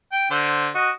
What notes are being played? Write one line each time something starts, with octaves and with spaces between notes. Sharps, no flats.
G5
D3 C5
F#4 D#5